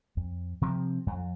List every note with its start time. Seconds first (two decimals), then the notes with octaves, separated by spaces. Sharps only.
0.17 F2
0.61 C3 F3 C4
1.07 F2